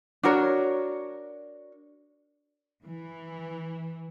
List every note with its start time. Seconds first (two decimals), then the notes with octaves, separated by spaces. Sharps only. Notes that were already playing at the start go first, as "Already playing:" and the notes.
0.23 D4 F#4 A#4 C#5
2.83 E3